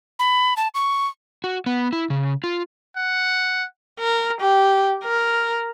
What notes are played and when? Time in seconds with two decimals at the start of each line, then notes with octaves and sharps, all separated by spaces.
0.19 B5
0.57 A5
0.75 C#6
1.44 F#4
1.66 B3
1.93 E4
2.10 C#3
2.44 F4
2.96 F#5
4.00 A#4
4.41 G4
5.04 A#4